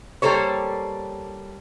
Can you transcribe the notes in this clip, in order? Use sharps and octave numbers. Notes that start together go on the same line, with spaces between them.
G3 A#3 A4 C5 C#5